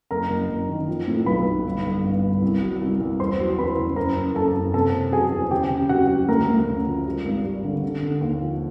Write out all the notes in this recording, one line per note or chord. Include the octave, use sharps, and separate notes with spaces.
F#1 A#4 A#5
F#1
F#1
D#3
F3
A2
B1 B4 B5
B1
G1
G1
G2
G1
C2
F#3
C2
C2
E2 C5 C6
F#3
E2 B4 B5
C#3
F#2 A#4 A#5
F#2
F#2 A4 A5
F#2
C3 A4 A5
C3
F#3 G#4 G#5
E2
C#3 G4 G5
C#3
C#3 F#4 F#5
F#3
D2 A#4 A#5
D2
C#3
F3
G3
G#1
G3
D3
D3
D3
D#2
F3